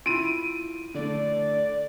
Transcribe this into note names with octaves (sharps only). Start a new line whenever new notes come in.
E4 F4 D7 D#7
D3 A3 D5